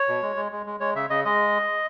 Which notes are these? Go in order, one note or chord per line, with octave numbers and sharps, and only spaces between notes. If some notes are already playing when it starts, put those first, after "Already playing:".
Already playing: C#5
B2
G#3
G#3
G#3
G#3
G#3 C#5
C#3 E5
C#3 D#5
G#3 D#5